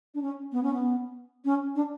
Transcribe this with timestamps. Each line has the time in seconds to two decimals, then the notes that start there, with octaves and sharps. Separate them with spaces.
0.14 D4
0.22 C#4
0.52 B3
0.63 C#4
0.73 B3
1.45 C#4
1.75 D4